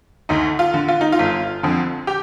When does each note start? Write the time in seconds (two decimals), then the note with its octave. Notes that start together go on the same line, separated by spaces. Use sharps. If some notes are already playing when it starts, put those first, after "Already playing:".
0.29 D2 D#4
0.59 F4
0.74 D3
0.88 F4
1.01 D#4
1.12 F4
1.19 G1
1.63 F2 D3
2.07 G4